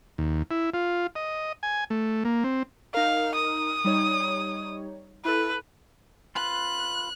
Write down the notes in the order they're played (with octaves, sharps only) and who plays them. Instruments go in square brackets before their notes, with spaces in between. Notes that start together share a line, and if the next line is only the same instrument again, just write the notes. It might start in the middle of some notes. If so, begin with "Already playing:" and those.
[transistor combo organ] D#2
E4
F4
D#5
G#5
A3
A#3
C4
[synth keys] D#4 A#4 [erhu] F5
[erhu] D#6
[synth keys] G3 D#4 C#5
[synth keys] E4 A4 [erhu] B4
[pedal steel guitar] F4 B4 [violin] F#6